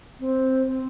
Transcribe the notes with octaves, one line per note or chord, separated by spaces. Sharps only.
C4
C4